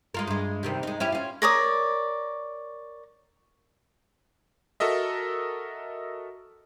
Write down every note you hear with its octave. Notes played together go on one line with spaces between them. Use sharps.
G#3 F4 A#4
G2 G#3
C3 D#3 G3
G#3 D#4
C#4 E4 G4
C#4 F4
A#4 C#5 D5 D#6
F#4 A4 A#4 D#5 E5